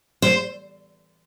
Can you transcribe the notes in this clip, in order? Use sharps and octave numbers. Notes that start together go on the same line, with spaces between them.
C5